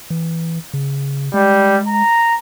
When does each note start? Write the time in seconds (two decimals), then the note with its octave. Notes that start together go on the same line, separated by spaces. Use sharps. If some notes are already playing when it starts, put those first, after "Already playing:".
0.10 E3
0.74 C#3
1.34 G3 G#3
1.88 A#5